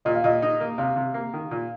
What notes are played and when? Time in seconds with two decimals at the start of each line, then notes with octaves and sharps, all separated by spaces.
0.05 A#2 D#5
0.15 F5
0.24 A#2 D#5
0.42 D#4
0.60 A#3
0.78 C3 F5
0.96 C3
1.14 A#3
1.33 D#3
1.51 A#2